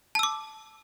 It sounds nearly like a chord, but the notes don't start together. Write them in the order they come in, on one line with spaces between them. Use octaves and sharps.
A5 E6 D6